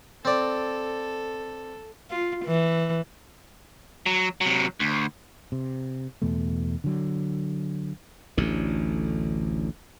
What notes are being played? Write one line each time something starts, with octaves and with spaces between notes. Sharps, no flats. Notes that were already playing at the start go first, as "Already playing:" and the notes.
C4 A4 D5
F4
E3
F#3
C3 F#3
D2
C3
E2 B2 A3
D3 F#3
A1 D2 D3